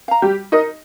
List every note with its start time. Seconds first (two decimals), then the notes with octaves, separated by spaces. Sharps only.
0.08 F5 A#5
0.22 G3 G4
0.52 D#4 A#4 D#5